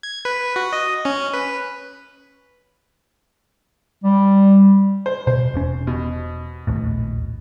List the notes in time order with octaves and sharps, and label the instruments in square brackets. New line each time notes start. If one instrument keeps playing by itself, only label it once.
[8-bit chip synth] G#6
B4
F#4
D#5
C#4
B4
[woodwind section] G3
[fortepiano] C5
[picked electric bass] B2 [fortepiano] C5
[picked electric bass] E1 C#4
[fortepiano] B2
[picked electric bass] A#1 D#2 A2